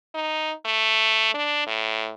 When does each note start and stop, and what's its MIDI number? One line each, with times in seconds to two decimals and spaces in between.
0.14 0.53 63
0.65 1.30 57
1.34 1.64 62
1.67 2.13 45